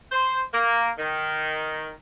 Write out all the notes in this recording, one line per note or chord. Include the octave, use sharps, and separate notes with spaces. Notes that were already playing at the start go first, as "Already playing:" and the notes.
C5
A#3
D#3